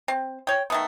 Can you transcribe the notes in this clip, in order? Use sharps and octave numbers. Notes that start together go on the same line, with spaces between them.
C4
C#5 G5
D#3 A3 B3